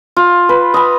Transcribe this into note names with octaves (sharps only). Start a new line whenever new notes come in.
F4
B4
D#5 B5